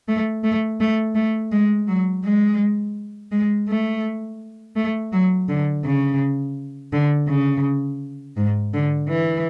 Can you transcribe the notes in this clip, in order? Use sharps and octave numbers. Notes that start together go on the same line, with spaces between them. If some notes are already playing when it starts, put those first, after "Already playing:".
A3
A3
A3
A3
G#3
F#3
G#3
G#3
A3
A3
F#3
D3
C#3
D3
C#3
G#2
D3
E3